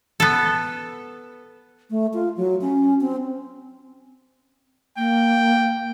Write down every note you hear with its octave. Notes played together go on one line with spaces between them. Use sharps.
B3 A4
A3
F4
F#3
C#4
C4
A#3 G5